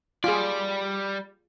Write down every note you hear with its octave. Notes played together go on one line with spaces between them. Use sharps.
G3 F4 G#4 D5